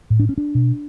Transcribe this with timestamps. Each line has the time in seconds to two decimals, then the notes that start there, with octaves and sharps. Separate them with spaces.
0.10 A2
0.20 D4
0.29 C#4
0.38 D4
0.55 B2